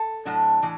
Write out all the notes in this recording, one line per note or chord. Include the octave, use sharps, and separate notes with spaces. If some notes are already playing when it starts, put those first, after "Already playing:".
Already playing: A4
A2 F#3 D4
A2 E3